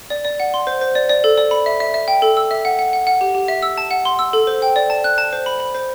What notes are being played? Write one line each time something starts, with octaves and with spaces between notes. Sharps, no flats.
D5
D5
F#5
C6
C5
C5
D5
D5
A4
D5
B5
E5
E5
E5
G5
A4
E6
E5
F#5
F#5
F#5
F#5
G4
G4
E5
E6
A5
F#5
C6
E6
A4
C5
G5
D5
A5
F#6
A5
C5
B5
B5
C5